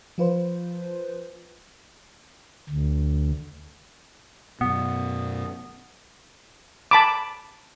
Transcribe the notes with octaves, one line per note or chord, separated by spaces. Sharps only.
F3 F4 B4 C5
D2
F#2 B2 B3
A5 B5 D6